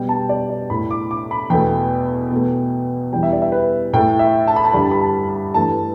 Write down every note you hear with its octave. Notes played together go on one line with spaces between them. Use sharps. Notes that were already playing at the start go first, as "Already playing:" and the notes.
Already playing: B2 G3 G5
A5
D5
D5
A2 A3 B5
D6
D6
B5
E2 B2 A3 G5
B2 A3
E2 E3 G3 G5
E5
D5
E5
B4
A2 A3 G5
E5
A5
B5
A5
G2 D3 G3 B5
A5
B5
A5
B5
G2 E3 A3 A5